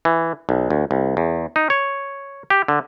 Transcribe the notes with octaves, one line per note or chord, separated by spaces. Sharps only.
E3
B1
D2
C2
E2
D#4
C#5
G4
D3